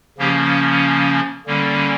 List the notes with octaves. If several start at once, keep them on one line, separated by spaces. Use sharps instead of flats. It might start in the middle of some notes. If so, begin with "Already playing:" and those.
C#3 F3 A#3 C#4 G4
D3 G3 A#3 C#4